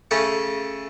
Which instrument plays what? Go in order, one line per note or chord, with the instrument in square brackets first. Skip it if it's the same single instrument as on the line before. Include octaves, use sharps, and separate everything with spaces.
[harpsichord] C#3 A3 C#4 A4 C#6